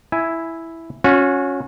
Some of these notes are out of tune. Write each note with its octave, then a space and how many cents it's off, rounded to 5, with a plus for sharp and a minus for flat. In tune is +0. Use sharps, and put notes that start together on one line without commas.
E4 +0 G#5 +0
C#4 +0 F#4 -35